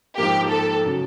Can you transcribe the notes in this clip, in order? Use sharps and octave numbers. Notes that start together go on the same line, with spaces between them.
G#2 F3 A#3 G4
A4
C#3 F#3